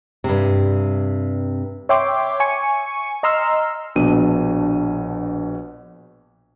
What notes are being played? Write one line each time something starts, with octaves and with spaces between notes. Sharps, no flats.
G2 C3
C#5 E5 G5 C6 D6
G#5 C#6 C#7
D#5 A#5 C6 E6 F6
A#1 B2 D4 D#7